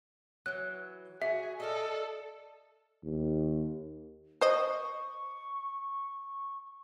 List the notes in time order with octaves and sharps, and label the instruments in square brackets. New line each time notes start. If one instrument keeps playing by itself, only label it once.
[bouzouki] E3 F#3 [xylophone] F#6
[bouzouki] F#4 [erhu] G#4 [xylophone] E5
[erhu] A4 [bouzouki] A#4 D5 D#5
[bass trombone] D#2
[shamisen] C5 D#5 [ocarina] C#6